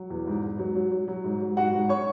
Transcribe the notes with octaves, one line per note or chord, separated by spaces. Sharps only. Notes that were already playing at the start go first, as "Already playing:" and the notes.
Already playing: F#3
E2
G#2
G#2
F#3
F#3
F#3
F#3
G#2
F#3
G#2 F#4 F#5
G#2
C#5 C#6